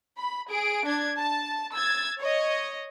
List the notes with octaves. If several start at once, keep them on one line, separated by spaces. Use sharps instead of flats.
B5
G#4 D7
D4 G#6
A5
E6 G#6 A6
C#5 D#5